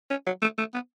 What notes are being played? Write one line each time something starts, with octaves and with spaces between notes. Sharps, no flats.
C#4
F#3
A3
A3
B3